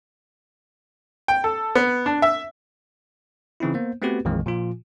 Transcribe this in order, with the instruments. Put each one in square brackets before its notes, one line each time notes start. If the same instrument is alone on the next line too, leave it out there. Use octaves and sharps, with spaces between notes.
[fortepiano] G5
A4
B3
D4
E5
[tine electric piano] C#3 E3 C4 D#4 E4
A#3 B3 C5
A3 B3 C4 F#4 G4 B4
A#1 F2 A#2 D#3 E3 G#3
A#2 F3 F4